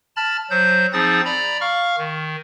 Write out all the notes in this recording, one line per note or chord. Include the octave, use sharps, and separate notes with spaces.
A5 B5 F6 A6
F#3 C5 G6
F3 C4 D#4 G#4 D#6 A6
D5 A#5 B5
F5 C#6 F6
D#3